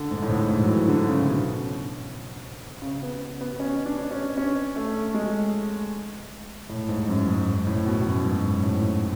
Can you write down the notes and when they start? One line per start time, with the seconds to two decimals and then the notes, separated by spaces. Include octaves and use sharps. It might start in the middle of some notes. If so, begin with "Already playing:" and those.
Already playing: D3
0.11 G#2
0.22 A2
0.30 G#2
0.50 A2
0.64 F#3
0.69 E3
0.88 D3
1.08 C#3
1.27 B2
2.82 C#3
3.02 B3
3.41 B3
3.60 C#4
3.86 D4
4.11 C#4
4.37 C#4
4.76 A3
5.14 G#3
6.69 A2
6.89 G#2
7.09 F#2
7.28 G#2
7.67 A2
7.86 B2
8.06 F#2
8.25 G#2
8.63 A2